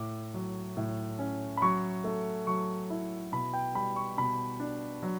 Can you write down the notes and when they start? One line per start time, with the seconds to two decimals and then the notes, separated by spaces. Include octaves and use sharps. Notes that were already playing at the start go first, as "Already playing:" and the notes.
Already playing: A2 D6
0.34 F#3
0.77 A2
1.19 C#4
1.57 B5
1.62 F#3 C#6
2.04 A3
2.47 F#3 C#6
2.90 E4
3.32 B2 B5
3.53 G5
3.75 G3 B5
3.96 C#6
4.17 B2 B5
4.60 D4
5.03 F#3